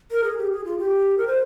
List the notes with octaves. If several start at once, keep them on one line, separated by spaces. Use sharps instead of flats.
A#4
G#4
G4
G#4
F4
G4
A#4
C5